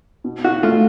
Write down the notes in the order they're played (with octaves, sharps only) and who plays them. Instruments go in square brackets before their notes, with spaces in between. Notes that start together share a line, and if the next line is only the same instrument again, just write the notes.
[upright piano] B2
[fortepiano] F#4
[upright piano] A3 [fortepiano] F4